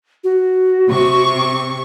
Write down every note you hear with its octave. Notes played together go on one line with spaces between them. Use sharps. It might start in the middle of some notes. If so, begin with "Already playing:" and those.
F#4
C3 C#6